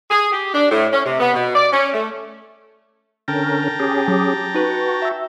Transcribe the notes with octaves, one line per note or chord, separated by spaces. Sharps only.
G#4
G4
D4
A2
C#4
C3
B3
B2
D5
C#4
A3
D3 C#4 A#4 G5 A5 A#5
C#4 G4 G#4
F#3 D6
D#4 F#4 B4
E5 E6